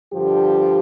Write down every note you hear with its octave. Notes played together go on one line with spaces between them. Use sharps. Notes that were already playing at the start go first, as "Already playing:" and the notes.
G2 D3 F3 G4